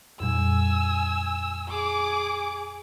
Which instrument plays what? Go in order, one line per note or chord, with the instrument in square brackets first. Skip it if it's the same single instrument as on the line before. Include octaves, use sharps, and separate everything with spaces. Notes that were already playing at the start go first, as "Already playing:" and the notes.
[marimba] F2 A#2 G3 [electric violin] G#5 E6
[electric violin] G#4 D6